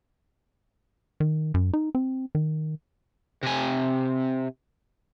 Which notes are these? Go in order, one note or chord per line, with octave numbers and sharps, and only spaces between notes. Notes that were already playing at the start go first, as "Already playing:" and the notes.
D#3
F#2
D#4
C4
D#3
C3 G#5